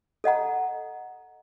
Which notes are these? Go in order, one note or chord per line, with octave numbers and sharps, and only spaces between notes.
A4 D#5 F#5 A#5